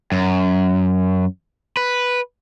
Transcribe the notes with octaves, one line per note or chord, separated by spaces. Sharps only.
F#2
B4